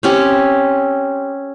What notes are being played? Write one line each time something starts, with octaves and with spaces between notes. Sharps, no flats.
C4 C#4 G4